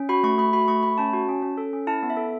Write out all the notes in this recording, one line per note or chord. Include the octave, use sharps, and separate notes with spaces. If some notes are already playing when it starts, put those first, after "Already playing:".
Already playing: C#4
F#4 B5
A3 C#6
A3 B5
F#4 B5
A3 C#6
A3 B5
C#4 A5
F#4
C#4
C#4
A4
C#4
E4 A5
B3
E5
A4